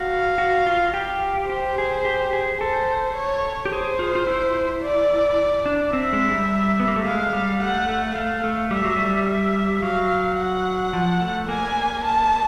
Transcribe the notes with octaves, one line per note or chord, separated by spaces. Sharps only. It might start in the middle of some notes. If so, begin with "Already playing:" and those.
Already playing: F#4 F5
F#4
F4
G4
G4 C5
G#4
G4
G#4
A4 C5
C#5
G4
G#4 C5
F4
F4
E4
D5
D4
C4 E5
G#3
G3
B3
A#3
A3
G#3 F5
G3
A3 F#5
A3
A3 F5
A3
G3 E5
F#3
G3
E5
F#3 F5
F#5
F3
A3
A#3 G#5
A5